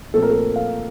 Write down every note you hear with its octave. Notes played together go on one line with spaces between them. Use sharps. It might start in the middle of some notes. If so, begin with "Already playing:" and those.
A#2 F3 A3 C4 A4
A#4
A4
F5